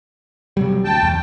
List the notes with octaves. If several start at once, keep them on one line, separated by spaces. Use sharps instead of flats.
C3 F#3 G3
D2 G5 A5
E2